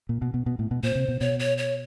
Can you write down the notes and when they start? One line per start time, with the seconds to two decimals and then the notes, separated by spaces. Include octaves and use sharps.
0.09 A#2
0.22 B2
0.34 B2
0.46 B2
0.59 A2
0.71 B2
0.83 A#2 C5
0.95 C3
1.09 B2
1.20 B2 C#5
1.39 C#5
1.58 C#5